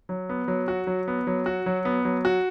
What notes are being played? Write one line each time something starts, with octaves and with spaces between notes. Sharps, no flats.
F#3
B3
F#3
F#4
F#3
B3
F#3
F#4
F#3
B3
F#3
F#4